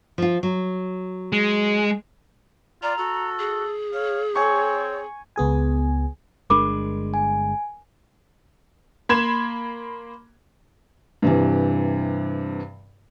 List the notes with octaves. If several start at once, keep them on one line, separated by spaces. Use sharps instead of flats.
F3 F4
F#3
G#3
F4 D5 A#5
F#4 A4
G#4
C#5 F5
C4 C#5 G#5 C#6
C#2 B3 G#4 G#5
G1 G#3 D4 A#4 B5 D6
G#5
A#3 B5 C6 G#6 E7
G2 C3 E3